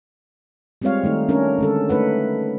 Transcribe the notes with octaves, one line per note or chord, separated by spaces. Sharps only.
G3 G#3 C4 F4 C#5 F5
D#3 A3 D#4
C#4 D4 A#4 C#5
D3 G#3 A4
A3 D#4 B4 F#5